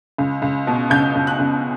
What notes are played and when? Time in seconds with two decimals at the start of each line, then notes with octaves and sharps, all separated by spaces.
0.18 C#2
0.42 C#2
0.67 B2
0.90 C#2 G6
1.15 C#2
1.27 F#6
1.39 C#2